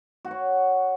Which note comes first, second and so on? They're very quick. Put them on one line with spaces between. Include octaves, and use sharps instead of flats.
F#4 F#5 C#5